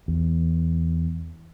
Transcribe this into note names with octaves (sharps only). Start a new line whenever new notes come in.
E2